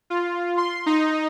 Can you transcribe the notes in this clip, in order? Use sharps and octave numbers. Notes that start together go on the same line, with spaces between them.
F4
C6
D#4